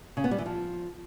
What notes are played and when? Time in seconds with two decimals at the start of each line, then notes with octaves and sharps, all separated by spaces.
0.17 C#3
0.24 B3
0.31 G3
0.38 E3
0.46 F3